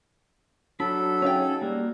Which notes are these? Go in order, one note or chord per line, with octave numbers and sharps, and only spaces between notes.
F#3 D4 A4 B5
C#4 D#4 G#4 C#5 F5 G5
G3 A#3 F#4 A#4